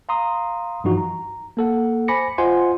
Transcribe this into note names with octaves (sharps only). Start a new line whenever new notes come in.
F5 A#5 C6 D#6
G2 E3 F3 D#4 F#4
A#5
A#3 A4 F#5
C5 G#5 B5 D6 A#6 C#7
F4 C5 D#5 F#5 G#5 C6